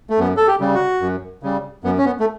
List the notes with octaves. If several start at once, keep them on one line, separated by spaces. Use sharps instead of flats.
A3
F#2 B3
A4
G4
C#3 G3
F#4
F#2
C#3 G3
F#2 B3
C#4
B3
A3